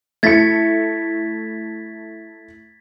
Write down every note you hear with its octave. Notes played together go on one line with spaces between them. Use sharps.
A3 E4 G#6 A6 B6 C#7